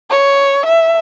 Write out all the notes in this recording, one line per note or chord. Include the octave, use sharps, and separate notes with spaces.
C#5
E5